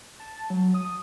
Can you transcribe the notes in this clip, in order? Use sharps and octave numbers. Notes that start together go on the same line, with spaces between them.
A5
F#3
D#6